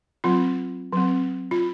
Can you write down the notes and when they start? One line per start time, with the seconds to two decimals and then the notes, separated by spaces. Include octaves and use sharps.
0.24 F#3 C4 F4
0.92 F#3 C4
1.51 F4